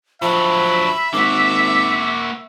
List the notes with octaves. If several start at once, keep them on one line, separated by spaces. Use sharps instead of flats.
G2 F3 F#3 E5 B5
G#1 A#3 F#4 D6